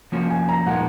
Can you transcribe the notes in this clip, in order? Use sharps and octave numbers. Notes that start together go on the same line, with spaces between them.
F3 A#3 C#4 F#4
G#5
A#5
A#2 F3 G#3 D#4 A#4 F#5